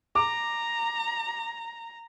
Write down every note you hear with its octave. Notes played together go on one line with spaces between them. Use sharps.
A#5 D6